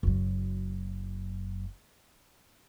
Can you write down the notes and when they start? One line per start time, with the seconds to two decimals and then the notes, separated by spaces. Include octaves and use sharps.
0.03 F#1 F#3